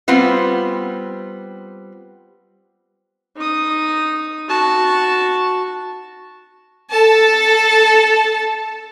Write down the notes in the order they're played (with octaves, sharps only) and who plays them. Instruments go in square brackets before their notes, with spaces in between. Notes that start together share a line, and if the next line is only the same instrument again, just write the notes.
[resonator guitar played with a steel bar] G3 B3 C4 F4
[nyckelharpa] D#4 D#6
F#4 A5
[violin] A4 A5